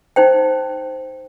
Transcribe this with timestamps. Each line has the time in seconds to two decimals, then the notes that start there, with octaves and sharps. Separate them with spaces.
0.16 D#4 C5 G5